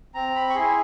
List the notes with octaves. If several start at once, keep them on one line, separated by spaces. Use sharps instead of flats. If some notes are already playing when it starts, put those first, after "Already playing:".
C4 A#5
B5
C#6
E4 G#4 C6